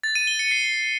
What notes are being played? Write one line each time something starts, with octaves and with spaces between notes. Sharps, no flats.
A6
D#7
G7
C#7
C7